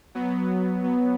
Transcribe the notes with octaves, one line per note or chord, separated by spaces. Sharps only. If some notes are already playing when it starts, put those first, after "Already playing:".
F#3 B3
F#3 B3